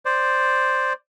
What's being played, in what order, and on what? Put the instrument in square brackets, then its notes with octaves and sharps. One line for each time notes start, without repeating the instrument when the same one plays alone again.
[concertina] C5 D5